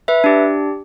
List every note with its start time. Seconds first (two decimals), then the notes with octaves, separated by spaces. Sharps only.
0.08 B4 E5
0.24 D4 G4